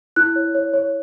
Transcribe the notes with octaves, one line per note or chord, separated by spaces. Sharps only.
E4 F#6
C#5
C#5
C#5